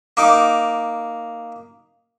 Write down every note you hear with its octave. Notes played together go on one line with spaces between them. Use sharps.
A#3 D#4 D6